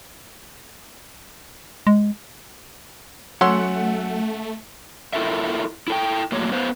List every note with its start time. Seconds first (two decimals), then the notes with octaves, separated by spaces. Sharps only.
1.87 G#3
3.41 F#3 A3 C#4 F#5 C6 E6
5.13 E4 F4 A4 A#4 E5
5.88 E4 A4 G5
6.32 A2 F#3 A#3 C#5
6.52 B3 B4 C5 F5